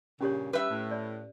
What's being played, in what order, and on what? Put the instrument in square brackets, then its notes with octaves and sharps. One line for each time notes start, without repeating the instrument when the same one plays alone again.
[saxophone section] G2 A#2 C#3 [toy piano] C#4 G4 C#5
[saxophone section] G3 [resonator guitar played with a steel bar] B4 E5
[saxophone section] A2
[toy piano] D5